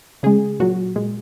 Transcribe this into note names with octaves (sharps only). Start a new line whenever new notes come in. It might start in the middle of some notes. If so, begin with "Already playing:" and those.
C#3 G#3 G#4
A#2 F#3 F#4
A#2 G#3